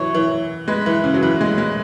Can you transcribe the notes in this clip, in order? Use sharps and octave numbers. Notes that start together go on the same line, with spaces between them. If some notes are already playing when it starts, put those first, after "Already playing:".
Already playing: E3 F#3 C#5
E3
G#3 B4
E3
C#3
F#3
E3 B4
G#3
G#3